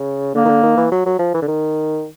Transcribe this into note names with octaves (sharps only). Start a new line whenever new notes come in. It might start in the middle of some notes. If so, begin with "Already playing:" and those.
Already playing: C#3
D3 A#3
D#3
D3
D#3
E3
F#3
F#3
F3
E3
D3
D#3